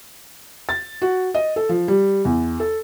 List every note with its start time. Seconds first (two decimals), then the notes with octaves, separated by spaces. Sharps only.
0.69 A6
1.02 F#4
1.34 D#5
1.56 A4
1.69 F3
1.88 G3
2.25 E2
2.60 A4